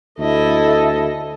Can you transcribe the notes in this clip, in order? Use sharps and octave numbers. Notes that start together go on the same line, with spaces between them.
D2 E4 A4 D#5